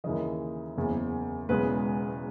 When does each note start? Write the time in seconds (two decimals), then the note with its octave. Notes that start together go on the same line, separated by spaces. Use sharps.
0.04 D#2 C#3 E3 D#5
0.77 F#1 E2 C#3
1.49 E1 E2 C#3 G#3 B4